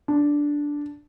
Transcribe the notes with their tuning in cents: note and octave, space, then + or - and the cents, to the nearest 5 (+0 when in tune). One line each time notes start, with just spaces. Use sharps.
D4 -5